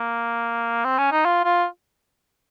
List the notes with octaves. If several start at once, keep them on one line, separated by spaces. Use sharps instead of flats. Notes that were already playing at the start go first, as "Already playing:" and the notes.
Already playing: A#3
C4
C#4
D#4
F4
F4